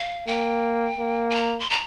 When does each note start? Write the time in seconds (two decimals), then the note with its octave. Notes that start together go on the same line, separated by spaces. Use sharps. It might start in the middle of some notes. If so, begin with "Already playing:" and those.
Already playing: F5
0.27 A#3 G5
0.99 A#3
1.30 G#5
1.35 A#5
1.60 C6
1.70 A#5